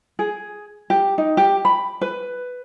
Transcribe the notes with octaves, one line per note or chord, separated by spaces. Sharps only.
G#4
G4
D#4
G4
B5
B4